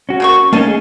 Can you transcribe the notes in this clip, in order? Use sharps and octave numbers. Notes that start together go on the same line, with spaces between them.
C#4 F#4
C#3 A#3 C#6
A#3 C#4 D#4 G#5 A5
A3 G#4